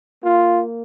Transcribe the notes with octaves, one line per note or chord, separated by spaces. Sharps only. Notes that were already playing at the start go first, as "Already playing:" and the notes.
A#3 F4